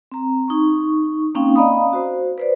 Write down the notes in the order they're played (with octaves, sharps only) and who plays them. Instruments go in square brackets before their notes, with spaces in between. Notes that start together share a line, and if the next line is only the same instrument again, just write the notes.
[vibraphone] C4 A#5
D#4 C#6
A#3 C4 C#4 D#4 F5 G5
D5 D#5 F5 A#5 B5 D#6
F#4 C5
B4 C5 D5